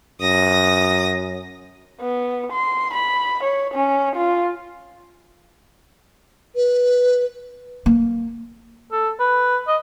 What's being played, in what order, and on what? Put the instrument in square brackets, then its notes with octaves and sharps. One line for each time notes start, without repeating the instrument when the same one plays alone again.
[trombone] F#2 [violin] D#6 A#6
[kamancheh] B3
C6
B5
C#5
C#4
F4
[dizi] B4
[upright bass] A#3
[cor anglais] A4
B4
D#5